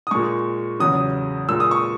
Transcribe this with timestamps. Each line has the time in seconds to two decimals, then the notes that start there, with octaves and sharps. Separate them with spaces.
0.07 D#6
0.11 A#2 G#3 C#6
0.80 E2 C#3 F#3 D#6
1.49 A#2 G#3 E6
1.60 D#6
1.71 C#6